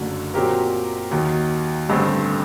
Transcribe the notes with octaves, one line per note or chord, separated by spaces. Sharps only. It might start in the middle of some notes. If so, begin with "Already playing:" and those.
Already playing: F#1 F#2 D3 F#3 A3
A#2 F#3 C4 G4 A#4
D#2 D#3 F#3
A1 G2 D3 A3 C4